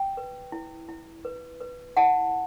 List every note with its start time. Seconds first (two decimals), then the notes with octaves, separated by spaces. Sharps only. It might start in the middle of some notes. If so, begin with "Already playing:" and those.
Already playing: G5
0.17 B4
0.52 E4
0.88 E4
1.25 B4
1.61 B4
1.97 E4 F#5 A5